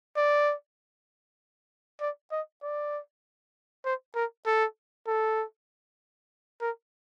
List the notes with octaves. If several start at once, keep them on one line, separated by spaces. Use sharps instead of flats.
D5
D5
D#5
D5
C5
A#4
A4
A4
A#4